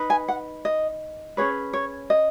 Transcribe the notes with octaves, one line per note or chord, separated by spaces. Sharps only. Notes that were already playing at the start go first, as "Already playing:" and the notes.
Already playing: D#4 B4
G#5
F#5
D#5
C#4 G#4 B4 C#5
C#5
D#5